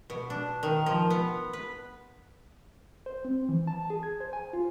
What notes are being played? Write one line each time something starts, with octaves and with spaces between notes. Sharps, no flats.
B2
D4
D#3
F3
B3
B4
C5
C4
E3
A5
G#4
G#6
C5
G#5
F4